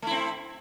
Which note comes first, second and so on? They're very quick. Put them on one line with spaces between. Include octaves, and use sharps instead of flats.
A3 E4 C4